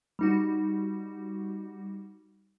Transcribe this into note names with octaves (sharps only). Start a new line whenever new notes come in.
G3 D#4 F#4